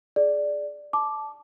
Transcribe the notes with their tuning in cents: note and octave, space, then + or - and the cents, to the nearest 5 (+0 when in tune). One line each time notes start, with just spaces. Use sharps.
G#4 +15 D5 +0
A5 -15 D6 +0